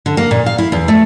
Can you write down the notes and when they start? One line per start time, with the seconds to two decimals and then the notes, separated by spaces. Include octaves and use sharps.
0.06 D3
0.17 A#3
0.31 A#2
0.46 F5
0.58 E4
0.72 E2
0.88 A3